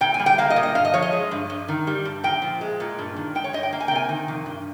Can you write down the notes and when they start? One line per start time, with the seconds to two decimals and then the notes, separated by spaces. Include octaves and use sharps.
0.01 A#2 G5
0.14 G#5
0.19 G3
0.26 G5
0.38 A#3 F5
0.50 D#5
0.56 A#2
0.63 D#5
0.75 G2 F5
0.85 D#5
0.94 F3 C#5
1.02 D#5
1.12 G#3
1.31 G2
1.50 G2
1.68 D#3
1.87 G3
2.05 G2
2.24 A#2 G5
2.42 F3
2.61 G#3
2.80 A#2
2.99 G2
3.16 D#3
3.35 G#3 G5
3.44 C#5
3.53 G2 D#5
3.63 G5
3.73 A#3
3.80 G#5
3.88 G5
3.91 C3 G#5
4.09 D#3
4.28 F2
4.46 G2